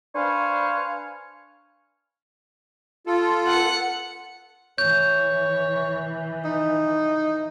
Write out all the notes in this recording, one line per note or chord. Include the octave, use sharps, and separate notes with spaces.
D4 B4 C5 F5 G#5 C#6
F4 A4
F#5 C#7
E3 C#5 G6
D#4